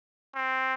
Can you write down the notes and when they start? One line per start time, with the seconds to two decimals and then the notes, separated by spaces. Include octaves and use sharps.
0.35 C4